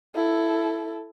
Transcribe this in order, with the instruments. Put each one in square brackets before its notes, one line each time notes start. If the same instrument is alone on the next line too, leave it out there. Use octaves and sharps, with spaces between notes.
[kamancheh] E4 A4